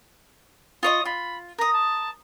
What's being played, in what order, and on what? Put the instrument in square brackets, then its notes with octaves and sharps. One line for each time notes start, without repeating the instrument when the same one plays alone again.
[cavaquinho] F4 C#5 D#5 [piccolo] D#6
[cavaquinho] F4 [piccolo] B5
[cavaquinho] A#4 D#6 [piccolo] A#6
[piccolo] A5